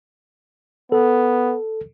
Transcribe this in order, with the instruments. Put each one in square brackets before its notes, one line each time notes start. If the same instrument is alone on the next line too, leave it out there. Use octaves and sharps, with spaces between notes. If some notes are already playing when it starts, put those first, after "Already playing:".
[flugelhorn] B3 [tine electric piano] A4